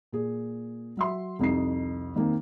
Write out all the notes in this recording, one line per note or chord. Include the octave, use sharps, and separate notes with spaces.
A#2 G#4
F#3 E5 C6
C2 F2 D#4 C7
D#3 A#3 C4